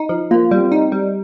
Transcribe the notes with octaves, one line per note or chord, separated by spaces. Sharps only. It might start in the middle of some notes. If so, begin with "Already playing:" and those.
Already playing: D#4
F3
A#3 F4
G3
C4
D#4
G3